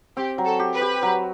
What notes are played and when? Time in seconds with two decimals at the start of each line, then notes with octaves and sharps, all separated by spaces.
0.17 C4 G4
0.38 F#3
0.45 A4
0.59 G4
0.74 B4
0.81 G4
1.03 F#3